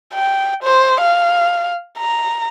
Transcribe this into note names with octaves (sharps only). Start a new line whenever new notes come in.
G5
C5
F5
A#5